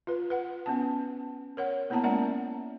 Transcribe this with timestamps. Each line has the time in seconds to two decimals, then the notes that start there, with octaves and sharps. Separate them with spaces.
0.07 F4 B4
0.30 B4 F#5
0.66 B3 C#4 A5
1.57 A#4 C#5 F#5
1.90 A#3 B3 E4 A#4 A5 A#5
2.03 G#3 C#4 D5 F#5 A#5